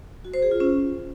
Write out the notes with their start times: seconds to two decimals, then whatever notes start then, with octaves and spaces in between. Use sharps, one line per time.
0.25 F#4
0.34 C5
0.42 G#4
0.51 F4
0.60 C#4